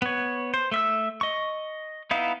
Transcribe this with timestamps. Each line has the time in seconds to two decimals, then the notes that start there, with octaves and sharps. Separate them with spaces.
0.02 B3 C#5
0.54 C5
0.72 A3 E5 E6
1.21 D#5 C#6
2.11 B3 D#4 E4 F5